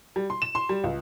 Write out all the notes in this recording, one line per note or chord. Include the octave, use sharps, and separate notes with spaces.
G3
C6
E7
C6
G3
C#2